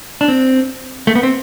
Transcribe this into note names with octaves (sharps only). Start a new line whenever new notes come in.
D4
C4
A3
B3
C4